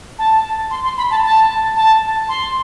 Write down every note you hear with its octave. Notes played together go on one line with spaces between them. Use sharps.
A5
C6
C6
B5
A5
A5
A5
C6